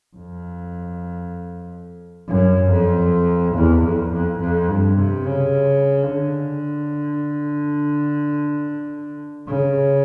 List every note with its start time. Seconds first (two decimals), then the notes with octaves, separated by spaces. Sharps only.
0.16 F2
2.29 F#2
2.71 F2
3.56 E2
3.83 F2
4.12 F2
4.41 F2
4.69 G2
4.97 C3
5.25 C#3
6.09 D3
9.48 C#3